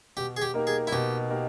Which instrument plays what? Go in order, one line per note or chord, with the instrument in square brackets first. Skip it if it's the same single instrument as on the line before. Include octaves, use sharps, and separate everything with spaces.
[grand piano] B2 [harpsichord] G4
[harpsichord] G#4
G4
[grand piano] A#3 D#4 G4 A#4
[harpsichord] G#4
E4
[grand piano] B2 [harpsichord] G4
[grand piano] A#3 D#4 G4 A#4